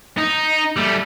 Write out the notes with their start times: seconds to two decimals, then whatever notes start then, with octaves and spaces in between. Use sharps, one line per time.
0.18 D#4
0.76 G3 A3